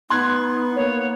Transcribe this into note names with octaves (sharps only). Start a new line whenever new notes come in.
B3 D#4 C6 F#6 G#6
A#3 C#5